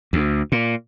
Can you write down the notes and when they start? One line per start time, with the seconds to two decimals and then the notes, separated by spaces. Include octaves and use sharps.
0.13 D2
0.52 A#2